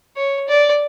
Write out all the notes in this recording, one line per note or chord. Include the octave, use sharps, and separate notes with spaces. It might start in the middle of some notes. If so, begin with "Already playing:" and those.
C#5
D5